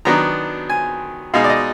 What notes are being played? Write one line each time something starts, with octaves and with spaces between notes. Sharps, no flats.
D#3 F#3 B3 D4 A#5
G#5
B2 G#3 D#4 F5
D5
D#5